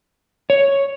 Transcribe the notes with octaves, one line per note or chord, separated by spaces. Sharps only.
C#5